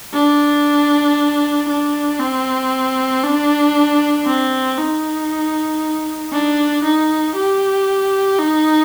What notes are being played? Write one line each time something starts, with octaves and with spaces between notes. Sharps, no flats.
D4
D4
C4
D4
C4
D#4
D4
D#4
G4
D#4